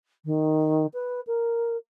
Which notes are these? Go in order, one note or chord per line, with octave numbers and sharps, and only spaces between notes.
D#3
B4
A#4